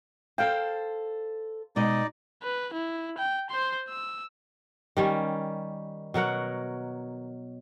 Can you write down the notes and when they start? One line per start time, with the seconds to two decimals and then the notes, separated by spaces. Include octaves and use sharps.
0.38 A4 C5 F5 G5
1.76 B2 G#3 D#4 D5 D#5
2.43 B4
2.73 E4
3.18 G5
3.50 C5 C6
3.88 E6
4.97 D#3 G3 C#4
6.14 B2 F#3 A#4 F#5